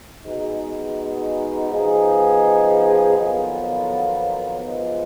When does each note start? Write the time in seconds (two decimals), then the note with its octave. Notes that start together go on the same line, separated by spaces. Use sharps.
0.25 B2 G#3 D#4
1.70 F3 B3 D#4 G#4
3.15 F2 D#3 F#3 B3 F4
4.60 F3 G#3 B3